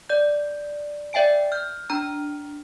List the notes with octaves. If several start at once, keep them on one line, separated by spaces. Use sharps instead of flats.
D5 G6
D5 E5 G5 G#5 D7
F6 G6
D4 A#5 F6